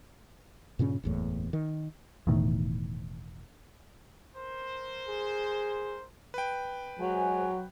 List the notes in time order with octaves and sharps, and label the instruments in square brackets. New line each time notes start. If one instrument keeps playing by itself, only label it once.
[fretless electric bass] G2 A#2 C#3 C#4
F#1 E2 A2
D#3
[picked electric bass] E1 E2 A2 D#3
[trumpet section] A#4 C5
[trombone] G#4
[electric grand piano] B4 G5
[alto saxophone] F#3 [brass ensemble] G#3 C5 G#5